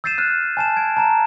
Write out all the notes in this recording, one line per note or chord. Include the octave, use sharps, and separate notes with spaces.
E6 G6 A6 C7 D#7 E7
F6 F#6 E7
G#5 A5 E7
G#6 D7
A5 A#5 E7